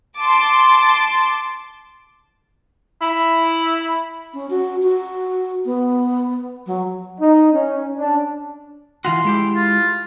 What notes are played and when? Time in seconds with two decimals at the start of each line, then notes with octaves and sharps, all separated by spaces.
0.18 A5 C6 D6
3.01 E4
4.34 C#4
4.50 F#4
4.82 F#4
5.65 B3
6.66 F#3
7.20 D#4
7.53 C#4
7.96 D4
9.05 E3 F4 F#4 C6
9.25 G#3 E4 G4
9.56 F4